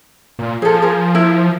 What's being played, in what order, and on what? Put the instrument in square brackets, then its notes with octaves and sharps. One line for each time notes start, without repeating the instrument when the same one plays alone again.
[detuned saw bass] A#2
[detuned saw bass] F3 [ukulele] G#4 A4
[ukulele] G#4 A#4
E4 A#4